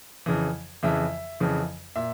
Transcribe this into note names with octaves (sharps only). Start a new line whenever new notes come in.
F2 C#3 E3
F2 C#3 E3 E5
F2 C#3 E3
A#2 E5